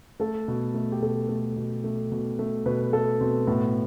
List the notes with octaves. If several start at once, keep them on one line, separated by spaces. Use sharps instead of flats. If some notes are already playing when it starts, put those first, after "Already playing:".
A3 A4
B2
A3
G4
B2 A4
A3
B2
A3
B2
A3
B2 B4
A3 A4
B2 C4
A2 B3